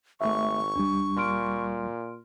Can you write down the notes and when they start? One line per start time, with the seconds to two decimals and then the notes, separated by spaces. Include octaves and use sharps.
0.21 G#1 A3 E5 C#6
0.75 D2 G3 D4
1.17 A#2 C6 F6 D7